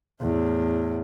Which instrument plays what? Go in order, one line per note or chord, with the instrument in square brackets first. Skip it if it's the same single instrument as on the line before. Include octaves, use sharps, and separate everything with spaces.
[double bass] E2 A2